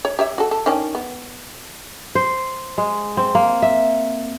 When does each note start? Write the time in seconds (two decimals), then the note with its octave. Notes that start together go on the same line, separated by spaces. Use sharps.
0.05 C#5
0.19 G4 C#5 E5
0.38 F#4 A4
0.51 A4
0.66 D#3 C#4 D4
0.95 B3
2.15 C5
2.78 G#3
3.17 C4
3.35 A#3
3.62 E5